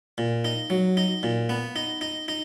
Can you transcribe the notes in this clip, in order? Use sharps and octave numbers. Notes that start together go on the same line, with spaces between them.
A#2
D#4
F#3
D#4
A#2
B3
D#4
D#4
D#4